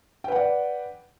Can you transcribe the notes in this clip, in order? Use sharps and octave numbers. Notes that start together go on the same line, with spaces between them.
B4 D5 F#5 G5